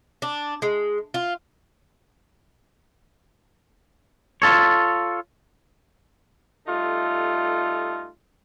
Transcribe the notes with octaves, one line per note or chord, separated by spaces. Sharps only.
D4
G#3
F4
F4 A4 C#5
G3 A3 D#4 F4 A4